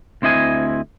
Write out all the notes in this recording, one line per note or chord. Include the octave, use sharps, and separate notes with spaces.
D2 C4 E4 D#5 G#5